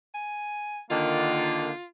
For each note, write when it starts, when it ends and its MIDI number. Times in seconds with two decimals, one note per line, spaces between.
0.14 0.80 80
0.90 1.70 50
0.90 1.70 51
0.90 1.70 58
0.90 1.85 65